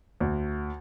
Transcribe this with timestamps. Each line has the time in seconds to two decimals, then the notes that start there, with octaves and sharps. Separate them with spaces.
0.20 D2